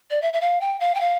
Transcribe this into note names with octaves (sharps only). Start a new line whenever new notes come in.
D5
E5
E5
F5
G5
F5
G5
F5